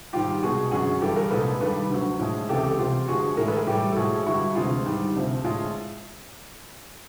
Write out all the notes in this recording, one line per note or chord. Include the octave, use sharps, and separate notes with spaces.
G#2 D#3 G3 F4 G4
C2 B2 G#3 F#4 G#4
F#2 D3 F#3 F#4 G#4
G2 E3 G3 G4 A4
G#4 A#4
C2 A#2 F3 G#3 A4 B4
G2 D#3 G3 A4 B4
D2 D3 F#3
A2 F3 G#3
C#2 C3 E3 G#3 G4 A4
G4 A4
C2 C3 E3 F4 G4
G2 D3 F3 G#3 F#4 G#4
A2 E3 G#3 G#4 A#4
A4 B4
G#4 A#4
A2 E3 G3 G4 A4
A4
A2 F3 G#3 F#4 G#4
G2 D3 G3 E4 F#4
D2 C3 E3 G#3 F4
G#2 D#3 G3
D2 C3 F3
A2 F3 G#3 F4